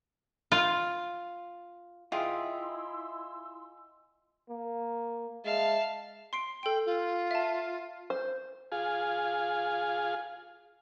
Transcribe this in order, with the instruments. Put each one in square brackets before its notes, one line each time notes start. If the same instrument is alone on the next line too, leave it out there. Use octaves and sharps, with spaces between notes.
[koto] F4
[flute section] E4 C6 E6 [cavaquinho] F4 G#4 [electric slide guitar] D#5 E5 G5
[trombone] A#3
[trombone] G#3 [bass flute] E5 [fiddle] F5 A5
[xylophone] C6 C7 D7
[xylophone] A4 D7 [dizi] G5
[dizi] F4
[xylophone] E5 A5
[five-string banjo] C5
[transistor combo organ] F4 G#4